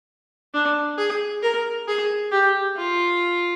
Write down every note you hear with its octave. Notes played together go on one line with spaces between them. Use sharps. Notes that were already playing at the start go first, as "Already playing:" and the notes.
D4
G#4
A#4
G#4
G4
F4